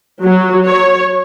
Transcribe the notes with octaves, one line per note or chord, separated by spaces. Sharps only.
F#3
C#5